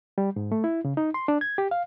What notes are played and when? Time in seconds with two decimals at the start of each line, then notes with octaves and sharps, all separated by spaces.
0.18 G3
0.36 G#2
0.52 A3
0.64 E4
0.85 C#3
0.97 D#4
1.14 C6
1.28 D4
1.41 G#6
1.58 G4
1.71 F5